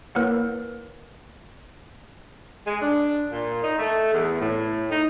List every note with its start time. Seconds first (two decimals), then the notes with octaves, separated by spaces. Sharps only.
0.15 A#3 E4 A#4 B4 C#5 F#5
2.67 G#3
2.82 D4
3.32 A#2
3.63 D#4
3.79 A3
4.13 E2
4.40 A2
4.91 D#4